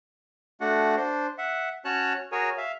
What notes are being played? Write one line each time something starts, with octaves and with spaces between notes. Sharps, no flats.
A3 D4 F#4 F#5
D4 C5
E5 F#5
C#4 F#4 C#5 A5 F#6
F#4 G#4 A#4 C#5 G#5
E5 F5